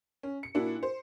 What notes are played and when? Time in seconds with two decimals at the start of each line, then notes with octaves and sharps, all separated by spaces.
0.23 C#4
0.43 C#7
0.55 A#2 D4 E4 F#4
0.83 C5